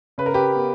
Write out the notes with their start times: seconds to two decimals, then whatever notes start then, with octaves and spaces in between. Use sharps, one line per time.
0.18 C#3 B4
0.26 A#4
0.34 G4 B4
0.55 B3